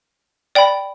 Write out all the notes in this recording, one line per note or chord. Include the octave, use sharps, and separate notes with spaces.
D5 G5 B5